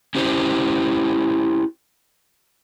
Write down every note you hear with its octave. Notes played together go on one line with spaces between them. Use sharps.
C#4 E4 G4 C5